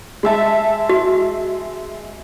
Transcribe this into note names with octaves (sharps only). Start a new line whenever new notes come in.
G#3 E5 A5
F#4